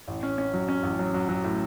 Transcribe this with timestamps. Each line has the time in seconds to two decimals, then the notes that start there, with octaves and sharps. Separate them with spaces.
0.08 A1
0.23 C#4
0.38 C#4
0.53 F#3
0.68 C#4
0.83 A1
0.99 F#3
1.14 F#3
1.29 F#3
1.44 A2